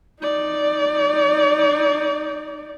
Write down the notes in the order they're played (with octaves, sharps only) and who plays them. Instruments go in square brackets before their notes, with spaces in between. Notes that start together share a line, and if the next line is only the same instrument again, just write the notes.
[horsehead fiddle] D#4 D5